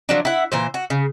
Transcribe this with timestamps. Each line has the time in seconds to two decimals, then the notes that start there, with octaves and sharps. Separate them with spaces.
0.09 F3 F#3 D4
0.25 E4 F#5
0.52 A#2 E3 C5
0.74 F#4
0.90 C#3